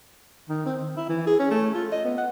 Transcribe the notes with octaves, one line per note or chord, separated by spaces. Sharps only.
D#3
C4
D#3
E4
E3
G#4
C#4
A3
F4
D#5
B3
F#5